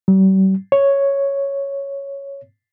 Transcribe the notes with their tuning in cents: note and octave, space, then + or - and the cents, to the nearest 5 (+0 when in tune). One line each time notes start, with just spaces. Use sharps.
G3 -45
C#5 +0